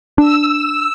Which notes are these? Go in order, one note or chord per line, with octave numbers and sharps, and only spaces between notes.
D4 E6